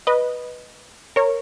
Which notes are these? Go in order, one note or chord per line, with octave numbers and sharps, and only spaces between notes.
B4 D#5
A#4 C#5